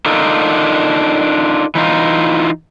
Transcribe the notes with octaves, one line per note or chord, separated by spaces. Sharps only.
D4 D#4 F4 A4 A#4
E3 D#4 F4